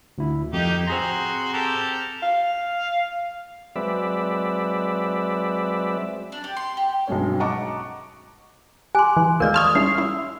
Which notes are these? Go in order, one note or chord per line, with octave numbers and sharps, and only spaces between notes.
D2 E4
F2 A#3 D#4 G4
C4 F#4 G#4 A#5 C6
G4 A4 A#4
F5
F#3 G#3 C4 B4 D5 E5
D4
G4
C6
G4
B1 G2 F#3 G#3 C#4 C#5
D#5 F#5 A5 A#5 C#6 D6
G4 G#5 C6 D6 F#6
E3
D#2 G#3 A#4 D5 F5 F6
A5 C6 C#6 D#6 F6 G#6
G3 C#4 E4 C7
E4 E6